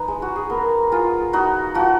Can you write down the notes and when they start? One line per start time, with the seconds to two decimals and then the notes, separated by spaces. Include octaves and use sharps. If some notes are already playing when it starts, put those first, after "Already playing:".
Already playing: D#4 B4
0.08 G#3
0.22 F#4
0.36 G#4
0.50 B3 A#4
0.92 G#3 F4
1.33 D#4 F#4
1.75 F3 F#4